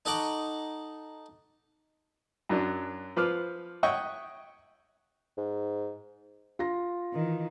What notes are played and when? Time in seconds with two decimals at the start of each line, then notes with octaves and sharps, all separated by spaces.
0.05 D#4 A4 D#5 F#5 C#6 D6
2.49 F#2 F#3 D4
3.16 F3 B4 C5 D6 F6
3.83 C#5 D#5 E5 F#5 G5 C#6
5.37 G#2
6.59 F4 A#6
7.13 D#3 E3